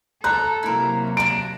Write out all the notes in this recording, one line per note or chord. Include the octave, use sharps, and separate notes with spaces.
A4 A#5 F#6
C3 F#3 A#3 E4 A#4
D4 A#5 D7